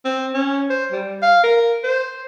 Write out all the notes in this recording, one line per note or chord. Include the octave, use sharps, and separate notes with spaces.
C4
C#4
C5
G3
F5
A#4
C5